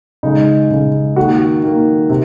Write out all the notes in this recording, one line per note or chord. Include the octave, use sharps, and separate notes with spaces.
C#3 G#3 D#4
C#3 G#3
D#3 A#3 F#4
D#3 A#3
C3